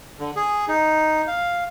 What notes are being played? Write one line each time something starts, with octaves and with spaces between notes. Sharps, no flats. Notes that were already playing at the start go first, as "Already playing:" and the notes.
D3
G#4
D#4
F5